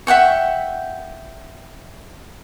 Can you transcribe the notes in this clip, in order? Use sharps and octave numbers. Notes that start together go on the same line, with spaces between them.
E5 F#5 G5 C#6